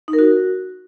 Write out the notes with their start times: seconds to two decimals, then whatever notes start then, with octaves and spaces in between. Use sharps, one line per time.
0.08 D#4
0.13 A#4
0.19 F#4